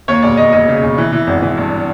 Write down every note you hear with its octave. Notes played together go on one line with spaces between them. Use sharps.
D#2 C#5
E1 D5
D#2 D#5
E1 D#5
C#3
E1
E3
E3
G#1
E3
G2